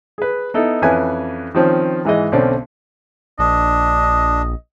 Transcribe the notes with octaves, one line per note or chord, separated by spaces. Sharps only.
G#4 B4
B3 D#4 E4 A4
F2 E3 C#4 E4 B4 G#5
D#3 F3 C4 C#4
G#2 E3 G#4 D#5
B1 D3 C4 C#4 D5
A#1 D4 D#5